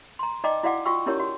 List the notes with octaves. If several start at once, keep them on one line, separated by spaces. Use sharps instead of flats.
A#5 C6
D#4 D5 D#5 G5 A#5 D6
E4 F#4 D5 F5 F#5 D6
F4 F#4 G5 C#6 E6
C#4 D#4 E4 G4 A#4 C#5
F#4